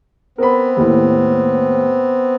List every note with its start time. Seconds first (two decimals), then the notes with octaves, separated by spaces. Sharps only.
0.38 B3 C4 A#4 B5
0.77 D#2 A2